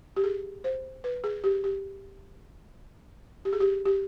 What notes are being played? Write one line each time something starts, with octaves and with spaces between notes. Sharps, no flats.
G4
G#4
C5
B4
G#4
G4
G4
G4
G#4
G4
G4